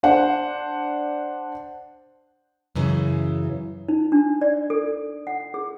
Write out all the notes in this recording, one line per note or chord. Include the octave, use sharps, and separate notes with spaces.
D4 C5 F#5
F#2 C#3 E3
D#4
D4
D5
A4
F#5
G#4